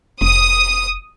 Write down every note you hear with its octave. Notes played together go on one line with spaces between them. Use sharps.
F1 D#6